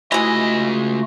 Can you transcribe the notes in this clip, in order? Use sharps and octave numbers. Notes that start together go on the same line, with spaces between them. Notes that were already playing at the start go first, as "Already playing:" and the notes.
C#2 E3 G#3 A3 F4 F#4 D#5